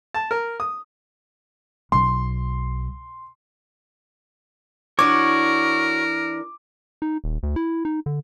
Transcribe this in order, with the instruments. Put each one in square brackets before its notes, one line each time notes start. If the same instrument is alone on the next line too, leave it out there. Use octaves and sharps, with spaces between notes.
[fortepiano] A5
A#4
D#6
[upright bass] B1 [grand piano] C6
[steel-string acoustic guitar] E3 D4 [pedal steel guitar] F#4 C#5 [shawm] A#4 [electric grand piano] D6
[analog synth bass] D#4
D#1
D2
E4
D#4
D3